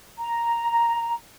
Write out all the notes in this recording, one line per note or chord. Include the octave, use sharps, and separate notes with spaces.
A#5